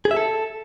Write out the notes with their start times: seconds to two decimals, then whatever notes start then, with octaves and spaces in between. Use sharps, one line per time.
0.05 G#4
0.11 E5
0.17 A4